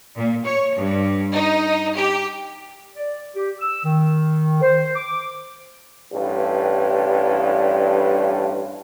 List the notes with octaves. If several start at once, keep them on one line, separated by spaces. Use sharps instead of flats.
A#2
C#5
G2
D#4
G4
D5
G4
E6
D#3
C5
D6
A1 G2